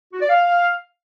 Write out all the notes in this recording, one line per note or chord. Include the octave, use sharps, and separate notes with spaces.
F#4
D5
F5